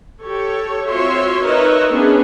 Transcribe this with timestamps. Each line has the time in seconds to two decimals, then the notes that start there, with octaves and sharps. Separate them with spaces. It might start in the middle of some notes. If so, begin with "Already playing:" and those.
0.24 G4 A4 C#5
0.88 C4 F4 F#4 C#5 E5 C6
1.42 D#4 A#4 B4 C#5 D#5 E5
1.90 B3 C#4 D4 G#4 B4